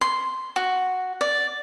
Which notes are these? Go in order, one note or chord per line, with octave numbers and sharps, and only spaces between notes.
C6
F#4
D5